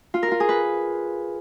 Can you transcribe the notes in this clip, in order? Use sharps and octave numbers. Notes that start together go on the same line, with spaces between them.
F4
A#4
F4
G#4
B4